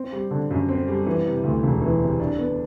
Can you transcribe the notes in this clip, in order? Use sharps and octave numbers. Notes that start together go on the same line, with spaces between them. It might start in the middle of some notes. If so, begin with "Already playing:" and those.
Already playing: C4
G3
D3
F#2
C4
G3
E3
C3
D2
E1
E3
C3
D4
B3